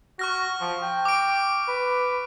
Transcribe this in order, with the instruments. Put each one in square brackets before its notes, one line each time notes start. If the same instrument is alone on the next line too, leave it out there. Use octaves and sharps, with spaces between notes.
[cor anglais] F#4 [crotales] C#6 F6 A#6
[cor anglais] F3
G5
[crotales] D6 D7
[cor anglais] B4